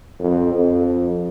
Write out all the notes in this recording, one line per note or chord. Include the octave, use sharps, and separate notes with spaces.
F2
F2